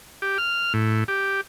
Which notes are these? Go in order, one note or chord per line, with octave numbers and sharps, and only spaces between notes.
G4
F6
A2
G4